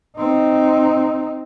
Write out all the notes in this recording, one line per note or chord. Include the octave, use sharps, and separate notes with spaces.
C4 D#4